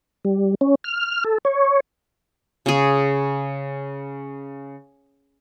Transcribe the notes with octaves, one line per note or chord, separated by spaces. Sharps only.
G3
C#4
F6
A4
C#5
C#3 G#4